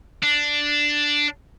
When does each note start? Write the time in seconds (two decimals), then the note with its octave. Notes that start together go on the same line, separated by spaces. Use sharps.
0.23 D4